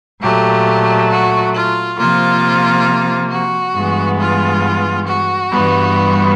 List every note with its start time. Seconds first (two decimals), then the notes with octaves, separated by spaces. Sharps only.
0.21 A#2 F#3 A3 G4
1.10 F#4
1.54 F4
1.98 C3 F3 A#3 F4
3.30 F#4
3.75 G2 E3 G#3 B3
4.19 F4
5.07 F#4
5.51 G2 E3 G3 B3